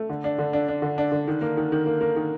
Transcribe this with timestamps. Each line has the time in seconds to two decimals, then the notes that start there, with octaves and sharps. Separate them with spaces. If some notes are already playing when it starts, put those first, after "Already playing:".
Already playing: A3
0.09 D3
0.24 D4
0.39 D3
0.53 D4
0.68 D4
0.82 D3
0.98 D4
1.12 D3
1.28 D#3
1.41 A#3
1.57 D#3
1.72 D#3
1.86 A#3
2.01 A#3
2.16 D#3